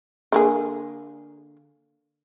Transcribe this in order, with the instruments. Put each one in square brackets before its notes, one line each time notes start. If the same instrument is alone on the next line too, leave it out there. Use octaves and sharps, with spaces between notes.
[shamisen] D3 A#3 G#4